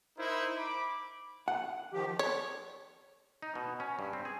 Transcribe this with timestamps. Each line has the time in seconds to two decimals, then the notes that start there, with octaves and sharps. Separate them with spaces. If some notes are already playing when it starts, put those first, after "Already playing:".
0.18 D#4 E4 A#4 C5
0.57 B5 D6
1.48 F#5
1.93 D#3 F3 G4
2.19 C#5
3.42 D#4
3.55 B2
3.80 C#4
3.99 G2
4.13 C4
4.25 G#4